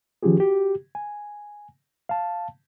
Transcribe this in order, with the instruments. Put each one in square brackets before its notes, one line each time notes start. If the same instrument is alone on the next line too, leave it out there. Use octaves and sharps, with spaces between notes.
[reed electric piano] D#3 F3 C#4 F4 G4 G#4
F#4 G4
G#5
F5 A5